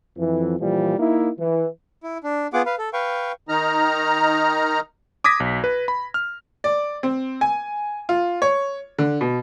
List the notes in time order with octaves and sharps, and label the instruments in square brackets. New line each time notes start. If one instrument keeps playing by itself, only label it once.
[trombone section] F2 E3
A#2 E3 F3 G3
A#3 D#4 E4
E3
[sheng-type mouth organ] E4
D4
B3 F4 G#4 F#5 D6
B4 F5
A4
B4 F5 G5 C#6
[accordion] D#3 D#4 A#5 F6
[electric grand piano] D6 D#6 G#6 A#6 B6
B1
B4
B5
F6
[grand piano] D5
C4
G#5
F4
C#5
D3
B2